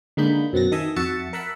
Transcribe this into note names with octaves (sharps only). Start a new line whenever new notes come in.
D3 G#3 A#3 D#4 B5 G6
F#2 B2 C4 F#5 A6 A#6
D#3 A4 D#5 E5 G#5
F2 F#4 E5 A5 A6 C#7
A#4 E5 F#5 A5 B5